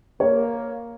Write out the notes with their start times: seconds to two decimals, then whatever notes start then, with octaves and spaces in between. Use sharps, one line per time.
0.20 A#3 C#5